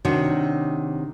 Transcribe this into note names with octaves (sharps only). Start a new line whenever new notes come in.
C3 D#3 D4 F#4 C#5